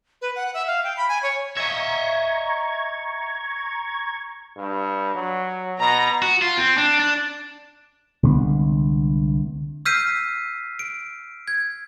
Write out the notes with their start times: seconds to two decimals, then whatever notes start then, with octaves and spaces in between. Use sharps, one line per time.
0.22 B4
0.36 F#5
0.54 E5
0.67 F5
0.84 G5
0.97 B5
1.09 G#5
1.23 C#5
1.57 D#5 E5 A#5 C#6 G#6
4.57 G2
5.15 F#3
5.80 B2 A#5 A#6
6.22 F#4
6.42 F4
6.58 C4
6.78 D4
7.00 D4
8.23 C2 D3 G#3 B3
9.85 E6 F6 G6 B6 C7 D#7
10.79 D7
11.48 G#6